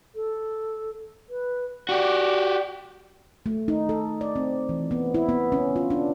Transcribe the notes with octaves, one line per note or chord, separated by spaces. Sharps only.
A4
B4
F#4 G4 D5
A3
D#4
A4
D5
C4
E3
B3
E4
B3
C#4
F4
D4